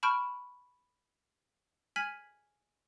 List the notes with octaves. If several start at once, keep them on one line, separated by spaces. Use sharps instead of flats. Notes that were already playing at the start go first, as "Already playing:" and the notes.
A5 B5 C#6 F6 G6 D7
G#5 F6 G#6 B6 F#7